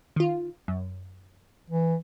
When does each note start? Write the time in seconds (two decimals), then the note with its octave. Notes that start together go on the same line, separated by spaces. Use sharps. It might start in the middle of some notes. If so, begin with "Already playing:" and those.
0.16 D#3 F4
0.68 F#2
1.70 E3